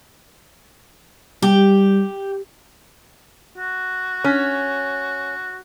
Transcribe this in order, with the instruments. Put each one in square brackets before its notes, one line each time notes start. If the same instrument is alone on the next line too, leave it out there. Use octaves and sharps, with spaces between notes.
[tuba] G3 [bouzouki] G4
[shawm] F#4
[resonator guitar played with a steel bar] C#4